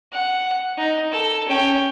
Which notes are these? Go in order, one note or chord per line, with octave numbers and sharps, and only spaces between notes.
F#5
D#4
A4
C#4 G5